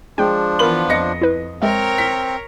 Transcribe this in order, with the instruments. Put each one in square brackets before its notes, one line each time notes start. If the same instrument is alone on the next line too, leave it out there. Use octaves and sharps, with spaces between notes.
[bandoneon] F3 D4 [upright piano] G#3 [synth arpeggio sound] G5
[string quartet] E3 B3 F4 [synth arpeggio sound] A#4 B5 [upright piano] F#7
[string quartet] F2 [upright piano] D#5 A#6 C#7
[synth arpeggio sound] E4 B4
[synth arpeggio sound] G#3 E5 [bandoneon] C4 [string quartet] A#4 C#5 A#5
[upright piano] B6